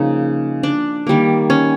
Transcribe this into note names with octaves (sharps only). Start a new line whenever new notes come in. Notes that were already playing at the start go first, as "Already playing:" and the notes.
Already playing: C#3 F3 A#3 D#4
D4
D#3 G3 A#3
C#4